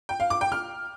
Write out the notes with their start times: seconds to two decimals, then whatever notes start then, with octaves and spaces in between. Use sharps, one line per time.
0.09 G5
0.20 F5
0.30 D6
0.41 G5
0.52 F6